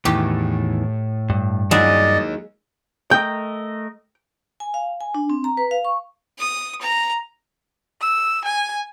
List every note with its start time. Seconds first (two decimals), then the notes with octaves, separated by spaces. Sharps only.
0.05 E2 A2 D#3 E3 G4
1.30 G2
1.71 F#3 G#3 A#3 D#4 E4 D5 D#5
3.11 A3 A#4 D#5 G5
4.60 G#5
4.74 F5
5.01 G#5
5.15 D4
5.30 C4
5.44 A#5
5.57 B4
5.71 F5
5.85 C#6
6.38 D#6
6.81 A#5
8.01 E6
8.45 G#5